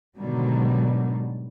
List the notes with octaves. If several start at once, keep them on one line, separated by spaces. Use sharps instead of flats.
G#2 B2 D3 D#3 F#3 G3